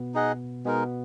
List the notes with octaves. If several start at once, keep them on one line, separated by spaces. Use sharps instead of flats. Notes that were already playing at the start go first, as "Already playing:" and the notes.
Already playing: B2 B3
D#4 G#4 D#5 F#5
B2 G#3 B3 D#4 A#4